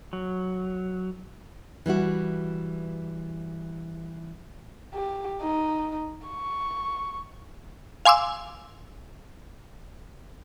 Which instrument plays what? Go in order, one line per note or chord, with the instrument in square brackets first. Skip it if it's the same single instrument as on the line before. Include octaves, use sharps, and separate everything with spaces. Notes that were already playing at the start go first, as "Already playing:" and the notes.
[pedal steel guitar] F#3
[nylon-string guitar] E3 G3 E4 F#4
[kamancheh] G4
D#4
C#6
[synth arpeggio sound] F5 G#5 C6 D6 E6